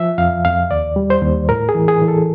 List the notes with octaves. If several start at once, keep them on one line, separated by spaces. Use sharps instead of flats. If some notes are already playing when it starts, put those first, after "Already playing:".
Already playing: F3 E5
F2 F5
F2 F5
D#2 D5
G3
C5
D#2
A2 A#4
G#4
E3
G#4
E3
A4